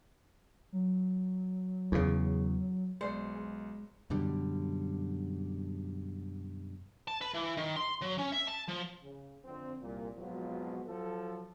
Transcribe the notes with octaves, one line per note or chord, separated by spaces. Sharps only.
F#3
E2 C#3
B1 G#3 C5 D5 C#7
G#3
F#2 B2 D3 G3
A5
B4
E3
D#3
C6
F#3
C#4
E5
A5
F3
C#3
F2 D3 C4
C2 A#2
F2 G#2 B2 F3 F#3
F3 F#3 A4